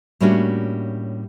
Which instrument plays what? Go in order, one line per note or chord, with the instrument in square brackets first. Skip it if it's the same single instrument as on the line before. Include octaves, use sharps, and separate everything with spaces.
[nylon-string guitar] A2 G3 A#3 C#4 D4 F#4